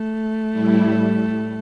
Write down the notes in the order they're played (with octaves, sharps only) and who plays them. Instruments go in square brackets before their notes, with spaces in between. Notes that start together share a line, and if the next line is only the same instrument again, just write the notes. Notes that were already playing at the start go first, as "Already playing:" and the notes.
Already playing: [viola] A3
[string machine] A2 G3 E4